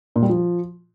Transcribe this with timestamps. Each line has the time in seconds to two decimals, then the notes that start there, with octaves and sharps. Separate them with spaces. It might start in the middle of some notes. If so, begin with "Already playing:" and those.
0.16 A#2
0.22 G3
0.29 F3